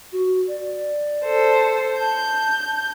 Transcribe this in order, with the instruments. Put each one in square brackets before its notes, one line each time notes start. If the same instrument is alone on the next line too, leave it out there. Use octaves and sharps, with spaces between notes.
[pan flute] F#4
D5
[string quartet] A4 C5
[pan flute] A5 [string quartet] G6